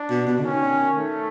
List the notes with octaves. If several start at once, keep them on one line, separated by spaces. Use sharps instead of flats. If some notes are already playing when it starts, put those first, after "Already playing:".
Already playing: D4
B2
B2
D3
D#3 C#4
A3